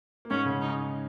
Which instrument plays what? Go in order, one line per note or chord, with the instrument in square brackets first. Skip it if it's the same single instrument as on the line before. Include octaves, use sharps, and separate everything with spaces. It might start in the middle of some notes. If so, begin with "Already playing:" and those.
[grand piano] A#3
[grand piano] G#2 G#3 [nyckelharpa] C#4
[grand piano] C#3
[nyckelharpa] D#4